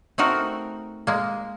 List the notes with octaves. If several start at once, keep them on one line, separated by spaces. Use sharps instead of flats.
A3 C4 D#4 F#4 A#4
G#3 A#3